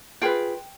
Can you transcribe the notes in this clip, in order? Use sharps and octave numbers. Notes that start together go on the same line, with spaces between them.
F4 G#4 B4 G5